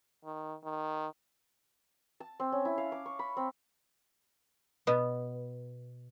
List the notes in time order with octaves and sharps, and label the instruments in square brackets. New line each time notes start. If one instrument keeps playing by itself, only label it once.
[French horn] D#3
D#3
[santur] A5
C4
C#4
E4
F5
D6
C#6
B5
C4
[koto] B2 B3